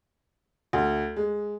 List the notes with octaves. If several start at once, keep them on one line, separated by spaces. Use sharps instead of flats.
D2
G#3